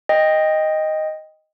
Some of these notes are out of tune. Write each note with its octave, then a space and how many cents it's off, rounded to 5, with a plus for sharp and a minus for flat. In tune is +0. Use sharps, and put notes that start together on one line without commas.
D#5 +0 G5 +15